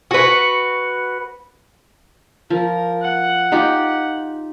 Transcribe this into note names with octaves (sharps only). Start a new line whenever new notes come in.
F#4 B4
F3 A#4
F#5
D#4 F4 G4